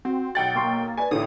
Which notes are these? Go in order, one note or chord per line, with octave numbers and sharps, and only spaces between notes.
C4 F#4
B1 F#5 G5 A6
A#3 C6 C#6 D#6
B4 D5 G#5
A1 A2 D3 D#6